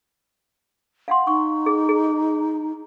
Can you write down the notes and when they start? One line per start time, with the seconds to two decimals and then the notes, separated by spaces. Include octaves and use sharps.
1.08 F5 F#5 C6
1.27 D#4 C#6
1.66 G#4
1.89 G#4